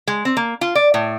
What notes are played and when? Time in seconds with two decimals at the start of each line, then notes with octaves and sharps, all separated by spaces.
0.08 G#3
0.25 C4
0.37 A#3
0.61 F4
0.75 D5
0.94 A2